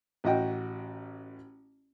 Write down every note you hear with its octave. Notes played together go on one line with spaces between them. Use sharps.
A1 F#4 D#5 G5